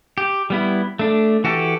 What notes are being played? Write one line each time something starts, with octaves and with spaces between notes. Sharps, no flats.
G4
G3 B3 E4
A3 D4
E3 F#4 G4 A4